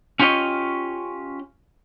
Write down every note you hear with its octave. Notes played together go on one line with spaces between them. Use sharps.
C#4 F4 G4 C#5 D#5